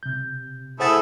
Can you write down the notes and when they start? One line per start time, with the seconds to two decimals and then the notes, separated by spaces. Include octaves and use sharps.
0.03 C3 G6
0.80 A3 E4 G#4 C5 F#5 A6